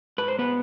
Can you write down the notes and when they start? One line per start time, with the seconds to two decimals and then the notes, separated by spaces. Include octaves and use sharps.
0.18 G#2 B4
0.28 C5
0.39 B3 B4